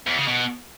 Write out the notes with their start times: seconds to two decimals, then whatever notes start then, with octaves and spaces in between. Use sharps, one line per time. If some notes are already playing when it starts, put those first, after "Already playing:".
0.07 E2
0.17 C#3
0.28 B2